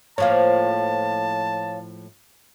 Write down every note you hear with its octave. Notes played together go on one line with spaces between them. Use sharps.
A2 F3 A#3 C#5 F5 A5